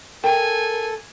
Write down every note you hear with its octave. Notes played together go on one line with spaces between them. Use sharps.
A4 A#4 G5 G#5